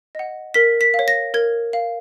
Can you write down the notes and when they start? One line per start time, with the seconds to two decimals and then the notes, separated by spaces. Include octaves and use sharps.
0.15 D#5 F#5
0.54 A#4 B6
0.81 B6
0.94 F5
0.99 C#5
1.08 A#6
1.34 A#4 G#6
1.73 F5